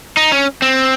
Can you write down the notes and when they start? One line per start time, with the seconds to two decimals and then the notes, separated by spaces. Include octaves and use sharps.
0.17 D#4
0.32 C#4
0.62 C4